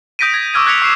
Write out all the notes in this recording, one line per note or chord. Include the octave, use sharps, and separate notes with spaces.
D#6 G6 A#6 B6 D7 D#7
G#6 A#6
C#6 D6 E6 F6 G#6 D#7
F#6 G#6 A#6 B6 C#7 F7
C#6 C7 E7